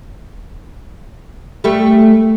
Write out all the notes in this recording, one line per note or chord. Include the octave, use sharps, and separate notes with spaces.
G3 A3